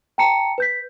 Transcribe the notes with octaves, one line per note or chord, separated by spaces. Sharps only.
G5 A5 A#5 C#7
B4 G6 B6